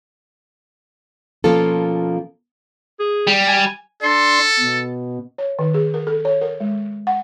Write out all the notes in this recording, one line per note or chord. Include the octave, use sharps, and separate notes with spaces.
B2 F3 A#3 C#4 F4 A4
G#4
G3
G#5
D4 A4 C6
B2
C#5
D#3
G#4
A#4
A4
C#5
A#4
G#3
F#5